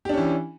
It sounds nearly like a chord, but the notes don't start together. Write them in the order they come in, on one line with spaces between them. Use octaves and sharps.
G4 D4 C#4 E3